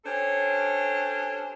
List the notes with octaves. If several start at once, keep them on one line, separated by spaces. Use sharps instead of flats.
C#4 D4 G4 A4 C5 C#5